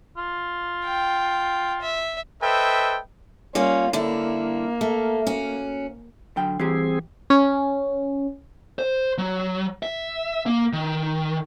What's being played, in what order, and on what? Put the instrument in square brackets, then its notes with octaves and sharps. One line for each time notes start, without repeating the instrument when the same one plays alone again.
[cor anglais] F4
[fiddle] G5
E5
[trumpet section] A4 B4 C5 D#5 E5 G5
[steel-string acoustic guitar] G3 A#3 F4 [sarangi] C#4
[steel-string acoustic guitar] D3 G3 E4 [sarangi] A#3
[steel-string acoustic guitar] A3
C#4 F#4
[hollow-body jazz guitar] D3 F#3 G5
[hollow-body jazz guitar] E3 G3 G4 [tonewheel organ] C4 G#4
[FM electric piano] C#4
[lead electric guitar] C5
F#3
E5
A#3
D#3